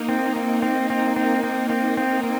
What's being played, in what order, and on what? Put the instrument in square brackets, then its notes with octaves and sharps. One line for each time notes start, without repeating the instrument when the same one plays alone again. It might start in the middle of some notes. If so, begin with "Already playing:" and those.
Already playing: [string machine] A#3 D#4
[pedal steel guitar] C4
C4
C4
C4
C4
C4
C4
C4
C4